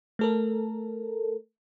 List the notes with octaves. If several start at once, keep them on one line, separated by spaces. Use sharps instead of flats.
A3 A4 A#4